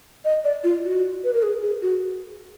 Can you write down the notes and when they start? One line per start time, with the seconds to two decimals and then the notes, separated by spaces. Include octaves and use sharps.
0.25 D#5
0.44 D5
0.64 F4
0.84 F#4
1.24 B4
1.33 A#4
1.43 G#4
1.62 G#4
1.82 F#4